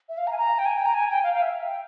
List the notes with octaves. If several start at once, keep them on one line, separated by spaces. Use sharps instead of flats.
E5
F5
A#5
G#5
A#5
G5
G#5
G5
A#5
G#5
G5
F5
F5
E5
G5